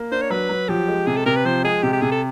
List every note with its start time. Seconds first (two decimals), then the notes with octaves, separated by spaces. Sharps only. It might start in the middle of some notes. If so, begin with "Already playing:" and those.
Already playing: A#3
0.12 D4 C5
0.22 C#5
0.31 F#3 B4
0.50 F#3
0.69 F3 G4
0.88 G#3
1.07 C3 G#4
1.17 A4
1.26 C3 A#4
1.36 B4
1.45 F3 C5
1.64 G#3 G#4
1.83 C3 G4
1.93 G4
2.02 C3 G#4
2.11 A4